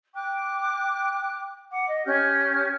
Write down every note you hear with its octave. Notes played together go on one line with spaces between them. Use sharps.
G5 D6 F#6
F#5 D6
D#5
C#4 G4 F6 G6